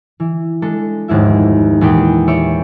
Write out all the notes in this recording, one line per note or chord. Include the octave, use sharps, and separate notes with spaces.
E3
G#3 D4 A4
F1 D#2 G#2 E4 E5
E2 A#2 E4 G4 D5 G5
C#5 D5 E5 G5 C#6